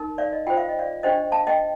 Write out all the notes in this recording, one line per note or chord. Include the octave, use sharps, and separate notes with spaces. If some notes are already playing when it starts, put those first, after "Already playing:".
Already playing: D#4 A#4
D5 F5
D#5
F4 C5 G5
F5
D#5
D5 F5
D4 G4 C5 D#5 G5
F5 A5
D#5 G5